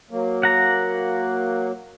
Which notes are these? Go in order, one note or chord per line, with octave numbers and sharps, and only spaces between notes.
F#3 A#3
F#5 A#5